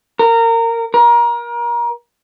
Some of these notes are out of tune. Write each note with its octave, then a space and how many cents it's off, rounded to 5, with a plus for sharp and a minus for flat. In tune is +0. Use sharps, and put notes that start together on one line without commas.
A#4 -20
A#4 +30